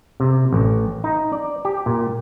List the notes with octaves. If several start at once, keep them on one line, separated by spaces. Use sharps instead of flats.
C3
A1
D#4
D5
G4
A#2